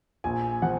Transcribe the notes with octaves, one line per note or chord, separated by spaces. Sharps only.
A#1 G#5
F3 F#5